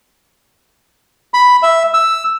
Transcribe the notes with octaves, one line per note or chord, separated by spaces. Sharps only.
B5
E5
E6